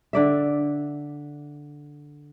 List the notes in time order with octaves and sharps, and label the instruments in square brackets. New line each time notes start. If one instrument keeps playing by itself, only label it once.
[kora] D3 D5 E5